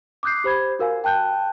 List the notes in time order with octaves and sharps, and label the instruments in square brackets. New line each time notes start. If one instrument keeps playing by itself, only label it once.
[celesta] D6 D#6 F#6 G6 C7
G4 C5 B5 G#6
F#4 A#4 F5 G#5
G5 A5 F#6 G6